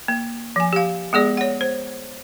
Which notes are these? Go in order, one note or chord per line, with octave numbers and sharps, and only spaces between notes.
A#3
F3 G#5
G4 F5
G#3 B3 G#4 D5
C#5 F#5
C5